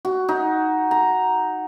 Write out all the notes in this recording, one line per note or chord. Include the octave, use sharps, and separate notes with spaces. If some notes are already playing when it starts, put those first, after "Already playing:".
F#4
D#4
A#5